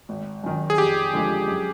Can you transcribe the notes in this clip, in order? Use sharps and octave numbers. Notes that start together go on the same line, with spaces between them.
G#1
F#2 D#3
G#4
F2 G4
D3 F3 G#3
F#2